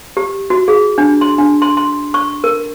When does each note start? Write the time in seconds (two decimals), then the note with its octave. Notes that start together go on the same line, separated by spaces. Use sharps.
0.17 G4
0.50 F#4
0.68 G#4
0.98 D4
1.21 C6
1.39 D4
1.62 C6
1.77 C6
2.14 C#6
2.44 A#4